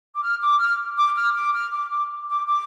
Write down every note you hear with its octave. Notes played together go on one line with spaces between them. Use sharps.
D6
F6
D6
F6
D6
F6
D6
F6
D6
D6
D6
D6